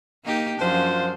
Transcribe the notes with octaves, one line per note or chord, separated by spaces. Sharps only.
A#3 D#4 G4
F#2 F3 C#4 D4 F4 C5